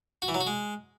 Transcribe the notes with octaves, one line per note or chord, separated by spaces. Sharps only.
F#4
E3
F#3
F#4
G#3